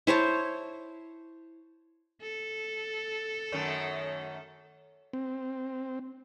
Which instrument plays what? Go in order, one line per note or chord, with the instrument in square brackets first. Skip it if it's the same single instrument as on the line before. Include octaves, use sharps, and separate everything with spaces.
[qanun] E4 C5 C#5 A5
[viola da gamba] A4
[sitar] F#2 D#3 A3
[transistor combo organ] C4